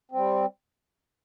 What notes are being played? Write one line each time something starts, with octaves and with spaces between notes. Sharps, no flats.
G3 C4